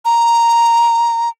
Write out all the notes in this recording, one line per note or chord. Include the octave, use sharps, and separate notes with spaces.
A#5